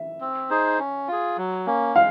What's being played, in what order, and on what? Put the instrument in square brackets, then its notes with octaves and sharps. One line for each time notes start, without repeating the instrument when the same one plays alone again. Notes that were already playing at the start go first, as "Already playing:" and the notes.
Already playing: [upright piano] E5
[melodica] C4
D#4 G#4 C5
C#4
F4 G#4
F#3
A#3 C#4
[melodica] G#3 [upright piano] F5